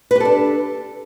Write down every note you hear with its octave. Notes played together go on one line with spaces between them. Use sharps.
D4 G4 A4 B4